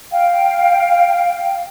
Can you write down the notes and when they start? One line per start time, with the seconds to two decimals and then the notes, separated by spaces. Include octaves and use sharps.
0.11 F5 G5